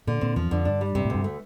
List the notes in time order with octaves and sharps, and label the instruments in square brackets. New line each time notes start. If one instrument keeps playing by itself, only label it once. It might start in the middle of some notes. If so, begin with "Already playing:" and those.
[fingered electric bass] A#2 [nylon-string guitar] D3
[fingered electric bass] A#2 [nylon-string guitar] C4
[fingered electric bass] E2 [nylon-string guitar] F3
[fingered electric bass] F2 [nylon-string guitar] D3
[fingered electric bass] G2 [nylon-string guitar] D4
[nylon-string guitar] G3
[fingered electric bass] G2 [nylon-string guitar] C3
[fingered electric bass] A2
[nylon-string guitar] D2 [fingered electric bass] G2
[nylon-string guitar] A3